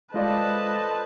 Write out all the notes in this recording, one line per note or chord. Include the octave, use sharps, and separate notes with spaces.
G#3 F4 A4 B4 C5 D5 D#5 A5